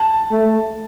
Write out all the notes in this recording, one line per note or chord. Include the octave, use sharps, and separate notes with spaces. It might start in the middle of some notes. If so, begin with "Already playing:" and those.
Already playing: A5
A3